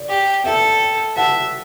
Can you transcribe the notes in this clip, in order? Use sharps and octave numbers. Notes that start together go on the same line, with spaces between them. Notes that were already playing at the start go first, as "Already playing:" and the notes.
Already playing: D5
G4
A4 E5 G5
E5 F#5 A5